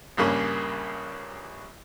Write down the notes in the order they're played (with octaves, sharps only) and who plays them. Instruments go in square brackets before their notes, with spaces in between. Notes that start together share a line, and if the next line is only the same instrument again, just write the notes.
[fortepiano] A#1 G2 C#3 A#3 C#4